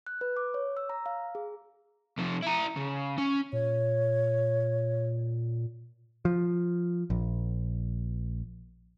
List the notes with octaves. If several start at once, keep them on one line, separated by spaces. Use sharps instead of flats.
F#6
B4
D6
C#5
E6
A#5
F5
G#4
C3 F3
E4 A#5
C#3
C#4
A#2 C#5
F3
A#1